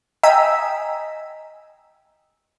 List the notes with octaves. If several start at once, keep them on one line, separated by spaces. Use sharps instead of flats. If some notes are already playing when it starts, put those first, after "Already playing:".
D#5 G5 G#5 A#5 E6 B6